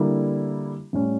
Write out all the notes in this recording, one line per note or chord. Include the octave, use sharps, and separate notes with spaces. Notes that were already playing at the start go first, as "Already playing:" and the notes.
Already playing: D3 G3 A#3 E4
A2 G3 C#4